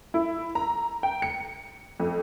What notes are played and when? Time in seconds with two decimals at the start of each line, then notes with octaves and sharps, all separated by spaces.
0.14 E4
0.55 A#5
1.03 G5
1.22 C#7
2.00 F2